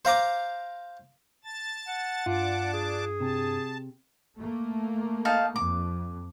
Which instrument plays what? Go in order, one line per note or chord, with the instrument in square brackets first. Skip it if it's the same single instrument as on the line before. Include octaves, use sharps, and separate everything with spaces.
[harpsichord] C5 F5 A#5 D6
[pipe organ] A5 A6
[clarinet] F#5
[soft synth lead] G2 [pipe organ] D4 A5 D6 [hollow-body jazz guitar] F4
[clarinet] G#4
[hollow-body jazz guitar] C3 [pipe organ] A5
[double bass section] A3 A#3
[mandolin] D#4 F5 A5
[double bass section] F2 [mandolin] D6